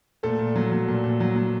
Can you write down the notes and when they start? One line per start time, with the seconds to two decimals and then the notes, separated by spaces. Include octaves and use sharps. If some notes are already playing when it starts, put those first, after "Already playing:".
0.23 A#2 A3 A4
0.39 A#2
0.56 F#3
0.71 F#3
0.88 A#2
1.04 A#2
1.20 F#3
1.36 F#3